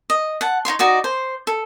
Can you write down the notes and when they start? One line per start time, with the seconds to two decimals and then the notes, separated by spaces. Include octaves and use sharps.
0.10 D#5
0.41 F#5 A5
0.65 D#4 E4 C#5 C6
0.79 D#4 F#4 D5 D#5
1.04 C5
1.47 A4